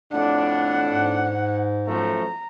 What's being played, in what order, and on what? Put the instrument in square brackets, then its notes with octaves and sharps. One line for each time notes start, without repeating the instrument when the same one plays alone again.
[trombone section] F2 A2 D4 [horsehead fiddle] F#5
[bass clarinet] G#2
[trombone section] F#2 F3 A3 [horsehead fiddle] A#5